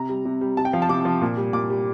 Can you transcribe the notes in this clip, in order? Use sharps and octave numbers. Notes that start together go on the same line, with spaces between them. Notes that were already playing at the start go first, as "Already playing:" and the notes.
Already playing: C3 A#5
G3
C3
G3
C3 A5
G5
F3 F5
A5
C3 D6
F3
A#2
G3
A#2 D6
G3